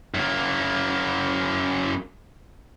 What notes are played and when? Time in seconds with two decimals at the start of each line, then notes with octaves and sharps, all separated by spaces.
0.14 F#2 A#3